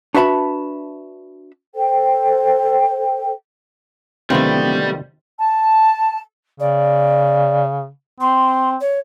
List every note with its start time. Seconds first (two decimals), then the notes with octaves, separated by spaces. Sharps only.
0.14 D4 F#4 B4 E5 A5 B5
1.73 A4 C5 G5
4.30 D1 C3 D#3 G3 A3 B3 C4 F4
5.40 A5
6.60 C#3 D5
8.20 C4 C6
8.80 C#5